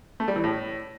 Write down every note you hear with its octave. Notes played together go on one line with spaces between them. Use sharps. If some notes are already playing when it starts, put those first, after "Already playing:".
A3
G3
E3
A2